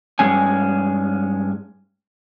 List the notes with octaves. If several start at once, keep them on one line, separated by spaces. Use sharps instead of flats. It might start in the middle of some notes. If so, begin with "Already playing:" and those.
G2 G#3 C#4 G#5